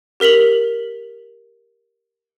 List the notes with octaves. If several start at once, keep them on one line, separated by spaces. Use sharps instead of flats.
G4 A#4 B6 F7 F#7